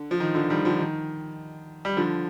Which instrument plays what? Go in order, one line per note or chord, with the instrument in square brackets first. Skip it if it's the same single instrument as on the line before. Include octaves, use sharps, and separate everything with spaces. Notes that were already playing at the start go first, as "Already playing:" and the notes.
Already playing: [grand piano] D3
F3
D#3
D3 F3
D#3 G3
D3 F3
D#3
G3
D3 F3